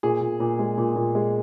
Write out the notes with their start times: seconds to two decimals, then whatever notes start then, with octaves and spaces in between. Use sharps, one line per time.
0.03 A#2 G#4
0.21 A#2
0.40 A#2
0.59 G#3
0.78 A#2
0.96 A#2
1.15 G#3